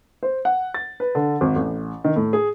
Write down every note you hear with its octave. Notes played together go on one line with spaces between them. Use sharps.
C5
F#5
A6
B4
D3
G#1
A1
D#3
A2
G#4